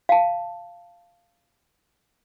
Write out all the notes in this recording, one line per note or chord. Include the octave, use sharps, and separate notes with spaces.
F5 A5